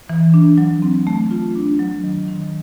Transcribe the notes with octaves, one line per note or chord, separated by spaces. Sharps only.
E3
D4
F#3
C4
A3
F4
D4
F#3
D#3
D#3